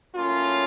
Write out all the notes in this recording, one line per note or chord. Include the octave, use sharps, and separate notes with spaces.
A2 F#3 A#3 C#4 F4